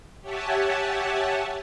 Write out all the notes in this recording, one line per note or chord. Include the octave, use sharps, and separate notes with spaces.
G4 C#5 E5 F#5 G#5 A5